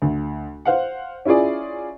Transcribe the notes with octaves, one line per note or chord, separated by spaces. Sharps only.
D2
C5 F5 F#5
C#4 E4 F4 G#4 D5